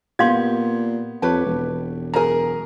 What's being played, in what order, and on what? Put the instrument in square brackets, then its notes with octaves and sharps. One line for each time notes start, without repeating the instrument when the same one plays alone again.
[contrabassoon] A#2 [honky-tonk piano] B3 G6 G#6 [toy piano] G4 F5 C6
[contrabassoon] F2 [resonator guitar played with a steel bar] G4 B4 C#5 [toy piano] A5
[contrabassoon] E1
[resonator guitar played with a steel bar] F#2 G#4 [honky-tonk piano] A#4 A#5